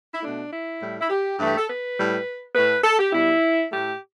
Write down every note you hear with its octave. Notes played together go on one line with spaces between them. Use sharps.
E4
B2 A3 D4
E4
A2 G3
E4
G4
G2 E3 A3
G4
A4
B4
A2 G3
A2 A3 B4
A4
G4
B2 G3 E4
A2 A3 G4